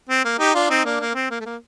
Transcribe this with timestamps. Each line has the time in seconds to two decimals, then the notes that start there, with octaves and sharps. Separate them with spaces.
0.09 C4
0.25 A#3
0.39 D#4 G4
0.54 D4 F4
0.69 C4 D#4
0.85 A#3 D4
1.00 A#3
1.15 C4
1.31 A#3
1.40 A3
1.46 A#3